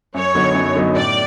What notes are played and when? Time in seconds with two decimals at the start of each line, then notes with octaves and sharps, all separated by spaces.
0.14 F#2 C#5
0.35 D3 F#3 B3 D#4
0.55 F#2
0.75 D3 F#3 B3 D#4
0.95 A2 D5